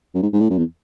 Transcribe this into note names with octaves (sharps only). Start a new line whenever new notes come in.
F#2
G#2
G#2
A2
F#2
E2